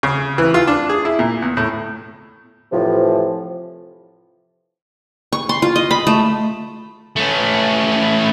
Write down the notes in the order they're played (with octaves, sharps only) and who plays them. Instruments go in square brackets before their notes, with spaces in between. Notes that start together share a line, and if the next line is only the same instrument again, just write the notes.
[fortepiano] C#3
E3
F4
D4
G#4
E4
A#2
E2
A2
[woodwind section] A2 C3 E3 F3
[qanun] C#6
C6
F4
D#5
B5
A3
[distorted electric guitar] A3 C#4